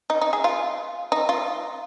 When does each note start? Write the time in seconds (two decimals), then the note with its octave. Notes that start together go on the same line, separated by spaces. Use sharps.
0.10 D#4
0.21 D#4
0.33 G#4
0.44 F4
1.12 D#4
1.29 F4